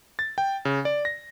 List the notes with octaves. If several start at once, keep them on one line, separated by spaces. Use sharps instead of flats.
A6
G5
C#3
D5
A#6